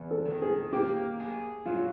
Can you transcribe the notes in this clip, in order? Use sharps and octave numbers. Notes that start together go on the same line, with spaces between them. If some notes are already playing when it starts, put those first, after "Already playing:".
Already playing: E2
A4
D#3
G#4
A#3 G4
G#4
F#3 F4